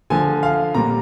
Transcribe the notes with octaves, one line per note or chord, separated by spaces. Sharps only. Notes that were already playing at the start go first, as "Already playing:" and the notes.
D3 F3 G#5
F5
A#2 G3 A#5